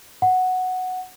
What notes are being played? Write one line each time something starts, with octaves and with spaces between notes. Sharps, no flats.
F#5